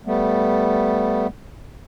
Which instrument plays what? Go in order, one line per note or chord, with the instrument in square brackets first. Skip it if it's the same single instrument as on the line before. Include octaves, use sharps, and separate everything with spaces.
[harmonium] G3 A3 B3